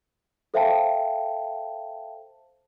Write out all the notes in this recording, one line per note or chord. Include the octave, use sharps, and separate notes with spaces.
A4 C5 E5 F5 G5 A5